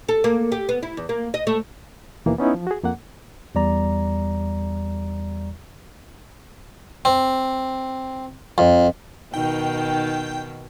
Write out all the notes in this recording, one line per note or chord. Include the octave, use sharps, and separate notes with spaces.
A4
A#3
G4
B3
E4
E2
A#3
D#5
A3
D#2 B2 E3 A#3
B3 C#4 D#4 E4
F3
F#4 G#4
F2 A#3 F#5
E2 G3 D5 A#5
C4
F2
B2 D#3 D#4 G5